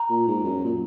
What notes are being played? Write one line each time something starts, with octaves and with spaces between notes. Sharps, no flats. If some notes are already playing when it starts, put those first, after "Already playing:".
Already playing: A#5
A#2
G#2
F#2
A#2